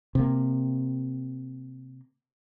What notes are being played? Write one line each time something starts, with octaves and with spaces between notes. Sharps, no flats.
C3 A#3